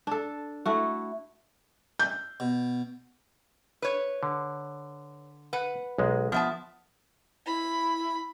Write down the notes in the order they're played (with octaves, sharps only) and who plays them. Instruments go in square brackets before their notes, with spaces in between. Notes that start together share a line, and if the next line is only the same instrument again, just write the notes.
[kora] D4 A4
A3 E4 F#4
[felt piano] G6
[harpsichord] B2
[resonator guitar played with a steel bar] B4 C#5
[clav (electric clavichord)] D3
[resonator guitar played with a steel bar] B4 F#5
[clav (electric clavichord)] B1 G#3
[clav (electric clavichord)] F3 [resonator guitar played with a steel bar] B3 E5 A5
[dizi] E4 [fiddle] B5